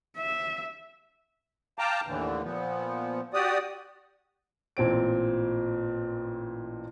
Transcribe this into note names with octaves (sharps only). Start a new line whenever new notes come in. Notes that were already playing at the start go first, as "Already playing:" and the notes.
E5
F5 G5 A5 A#5 D6
D#2 A2 D3 E3
A#2 F3 B3
F#4 G4 D5 D#6
A1 A#2 C4 D7